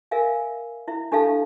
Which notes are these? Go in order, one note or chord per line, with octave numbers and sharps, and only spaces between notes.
A#4 E5 F5 G#5
E4 E5
D4 G4 A4 E5 F5 A5